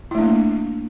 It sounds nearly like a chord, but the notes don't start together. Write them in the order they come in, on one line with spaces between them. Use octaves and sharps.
E4 A3 D4 A#3